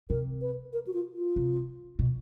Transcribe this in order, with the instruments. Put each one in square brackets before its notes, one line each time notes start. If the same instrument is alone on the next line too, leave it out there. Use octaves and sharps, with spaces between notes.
[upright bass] C3 [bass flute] A#4
[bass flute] B4
A#4
F#4
F4
F4
[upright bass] C3
B2